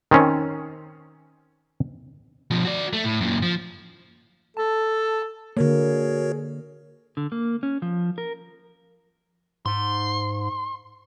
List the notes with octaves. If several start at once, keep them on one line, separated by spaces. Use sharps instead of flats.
D#3 C4 C#4
B2 F3
F#4 D5
A3
A2
F#2 A#2
F3
A4 A5
D3 A#3 F#4 G#4 A#4 C#5
D3
A#3
C#4
F3
A#4
G#2 C6